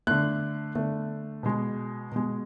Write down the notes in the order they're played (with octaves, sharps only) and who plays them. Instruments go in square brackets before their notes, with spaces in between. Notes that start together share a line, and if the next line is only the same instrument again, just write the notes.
[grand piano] D3 A3 F#6
D3 A3
B2 G#3
B2 G#3